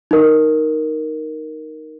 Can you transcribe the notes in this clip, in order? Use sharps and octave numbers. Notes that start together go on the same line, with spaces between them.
D#4 A#4